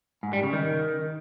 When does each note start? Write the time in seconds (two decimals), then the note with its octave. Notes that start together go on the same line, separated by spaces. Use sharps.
0.23 G#2
0.33 G3
0.43 C#3
0.53 D#3